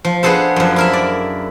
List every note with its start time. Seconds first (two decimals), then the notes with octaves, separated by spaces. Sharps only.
0.05 F3
0.23 B3 D4 G#4 A4 C5
0.56 F#2 F3
0.76 E4 A#4 E5
0.93 D5